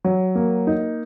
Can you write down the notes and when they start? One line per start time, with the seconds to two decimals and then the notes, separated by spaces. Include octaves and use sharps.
0.04 F#3
0.35 A#3
0.67 D#4